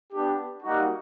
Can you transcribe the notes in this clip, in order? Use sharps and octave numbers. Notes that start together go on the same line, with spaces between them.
B3 D4 G4
G3 A#3 D#4 F#4